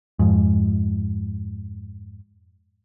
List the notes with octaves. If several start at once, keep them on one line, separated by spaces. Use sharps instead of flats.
F2 G#2